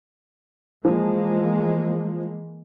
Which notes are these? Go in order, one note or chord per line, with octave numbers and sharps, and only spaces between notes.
E3 F3 G#3 A#3